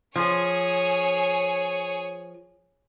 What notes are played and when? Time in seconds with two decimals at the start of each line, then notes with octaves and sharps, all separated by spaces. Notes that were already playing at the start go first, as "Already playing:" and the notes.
0.16 F3 G#4 C#5